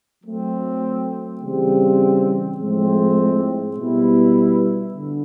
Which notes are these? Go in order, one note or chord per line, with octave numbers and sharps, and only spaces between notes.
F#3 A3 C4
C#3 E3 G3 C4
A2 F3 G#3 C4
B2 G3 B3 E4
D3